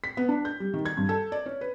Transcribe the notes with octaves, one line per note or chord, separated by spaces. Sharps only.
B6
B3
D4
G6
G3
D#3
G#6
G2
A4
D5
C#4
B4